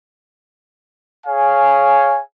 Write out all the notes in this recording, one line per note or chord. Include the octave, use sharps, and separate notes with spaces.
G#4 C#5 F5 G#5